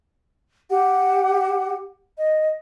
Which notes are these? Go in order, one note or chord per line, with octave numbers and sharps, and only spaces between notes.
G4 F#5
D#5